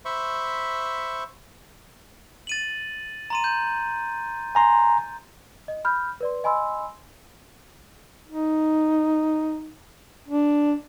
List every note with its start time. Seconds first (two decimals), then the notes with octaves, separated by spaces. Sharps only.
0.05 C5 E5 B5 C#6
2.47 A6 D#7 F#7
3.30 A#5 C6 D#7
3.44 G6
4.55 G#5 A#5 C6
5.68 D#5
5.85 B5 F6 G6
6.21 B4 D5 C6
6.44 D#5 G#5 B5 C6 E6
8.28 D#4
10.28 D4